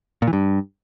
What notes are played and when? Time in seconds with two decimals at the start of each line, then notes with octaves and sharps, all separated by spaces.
0.22 A#2
0.27 E3
0.33 G2